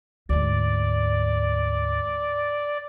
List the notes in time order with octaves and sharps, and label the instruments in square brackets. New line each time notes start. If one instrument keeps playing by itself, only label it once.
[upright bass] D2 G#2 [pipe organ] D5